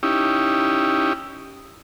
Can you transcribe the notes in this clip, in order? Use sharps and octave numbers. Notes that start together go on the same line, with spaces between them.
C#4 D#4 E4 G4